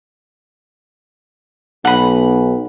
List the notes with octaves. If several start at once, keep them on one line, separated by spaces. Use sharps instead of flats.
B1 F#5 B5